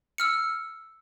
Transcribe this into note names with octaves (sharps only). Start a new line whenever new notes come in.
E6 F6 C#7